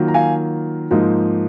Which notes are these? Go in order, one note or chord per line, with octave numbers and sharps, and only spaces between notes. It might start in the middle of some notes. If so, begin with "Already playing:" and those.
Already playing: D#3 F#3 A#3 F4
A#5
F5 G#5
G#2 F3 A#3 D#4